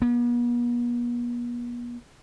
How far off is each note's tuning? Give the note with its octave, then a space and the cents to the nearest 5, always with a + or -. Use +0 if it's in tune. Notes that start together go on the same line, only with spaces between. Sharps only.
B3 -45